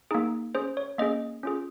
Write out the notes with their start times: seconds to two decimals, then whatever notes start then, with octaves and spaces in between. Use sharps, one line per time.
0.11 A#3 D#4 G#4
0.55 C#4 G#4 C5
0.77 C#5
0.98 A#3 C#4 G#4 D#5
1.43 C#4 F4 G#4